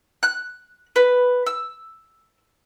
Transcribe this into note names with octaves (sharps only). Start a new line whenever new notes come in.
F#6
B4
E6